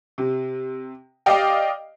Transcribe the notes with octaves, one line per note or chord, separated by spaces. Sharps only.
C3
G4 D5 D#5 F5 G5